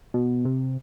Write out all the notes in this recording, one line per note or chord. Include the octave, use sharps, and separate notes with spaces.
B2
C3